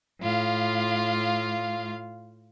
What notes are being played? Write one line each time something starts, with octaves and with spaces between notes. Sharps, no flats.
A2 F4 F5